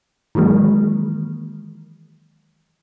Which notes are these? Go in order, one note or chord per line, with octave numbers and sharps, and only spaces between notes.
D#3 E3 F#3 G#3 A#3